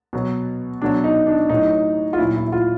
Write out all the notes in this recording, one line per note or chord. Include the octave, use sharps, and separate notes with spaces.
B2 F#3
B2 F#3 D4
D#4
D4
A2 F#3 D#4
F4
A#2 F#3 E4
E4
E4
F4